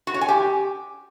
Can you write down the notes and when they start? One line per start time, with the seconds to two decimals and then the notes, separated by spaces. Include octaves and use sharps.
0.07 F#4
0.14 C#5
0.21 G#5
0.28 G4